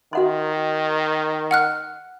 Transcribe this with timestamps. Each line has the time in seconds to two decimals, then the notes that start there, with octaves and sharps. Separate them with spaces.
0.13 D#3 F#4 F#5 C6
1.51 F#5 F6 F#6